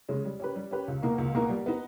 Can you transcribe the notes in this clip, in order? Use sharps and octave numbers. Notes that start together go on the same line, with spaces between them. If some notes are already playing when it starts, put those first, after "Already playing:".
C#3 G#3 C#4
G3
C#4 G4 B4
G3
C#4 G4 B4
C#2
B2 A#3 D#4 A#4
C#2
B2 A#3 D#4 A#4
G3
B3 D#4